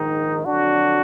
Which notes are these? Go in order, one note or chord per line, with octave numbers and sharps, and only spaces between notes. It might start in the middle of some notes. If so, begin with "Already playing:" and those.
Already playing: A#1 G#2 D#3 D#4
F2 D3 F#3 D4 F#4